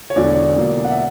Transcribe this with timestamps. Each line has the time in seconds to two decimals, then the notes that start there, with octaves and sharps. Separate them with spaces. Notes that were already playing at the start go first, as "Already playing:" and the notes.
0.10 C#5
0.16 E1 E2 D3 F#3 D5
0.57 E1 E2 B2 F#3 A#3
0.85 F#5
0.91 E5